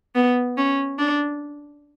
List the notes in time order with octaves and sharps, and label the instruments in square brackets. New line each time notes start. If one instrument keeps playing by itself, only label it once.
[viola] B3
C#4
D4